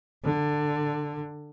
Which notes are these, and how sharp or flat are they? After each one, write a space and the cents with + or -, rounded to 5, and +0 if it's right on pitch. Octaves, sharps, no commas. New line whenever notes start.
D3 +15